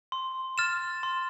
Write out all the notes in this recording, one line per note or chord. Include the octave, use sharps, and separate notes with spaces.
C6
F6 A6 E7
C6